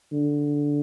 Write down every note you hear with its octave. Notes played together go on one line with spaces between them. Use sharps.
D3